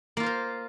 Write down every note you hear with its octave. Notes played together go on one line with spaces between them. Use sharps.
A#3 F4 A#4 C5